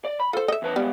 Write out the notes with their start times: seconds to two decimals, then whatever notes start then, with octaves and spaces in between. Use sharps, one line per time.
0.05 D5
0.20 B5
0.33 F4 A4 C5
0.48 D#5 E5
0.62 E2 B4 A5
0.76 G3 G#3 B3